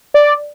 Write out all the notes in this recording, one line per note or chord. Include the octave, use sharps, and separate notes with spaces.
D5